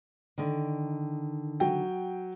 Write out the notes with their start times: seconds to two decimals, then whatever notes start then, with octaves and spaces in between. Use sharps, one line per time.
0.38 D3 D#3
1.60 F#3 G5